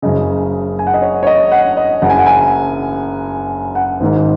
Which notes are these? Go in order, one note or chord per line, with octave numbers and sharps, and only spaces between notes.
F#1 F#2 C#3 D#5
G#5
F#5
D#5
C#5
C#5
D#5
F#5
D#5
F#1 F#2 C#3 F#5
G#5
F#5
G#5
F#5
G#1 G#2 D#3